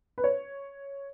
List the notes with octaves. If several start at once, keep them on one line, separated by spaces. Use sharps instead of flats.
B4
C#5